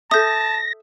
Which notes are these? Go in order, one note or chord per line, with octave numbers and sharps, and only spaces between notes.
A4 E5 A5 D#6 G6 A#6